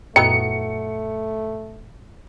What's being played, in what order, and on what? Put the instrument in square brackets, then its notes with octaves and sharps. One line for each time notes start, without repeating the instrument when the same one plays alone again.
[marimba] F#2 A#2 G5 [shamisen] F#3 B3 D#4 [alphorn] A3 [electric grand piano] C#7